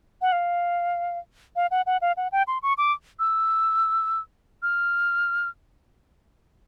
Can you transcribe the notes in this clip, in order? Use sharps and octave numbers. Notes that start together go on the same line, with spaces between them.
F#5
F5
F5
F#5
F#5
F5
F#5
G5
C6
C#6
D6
E6
F6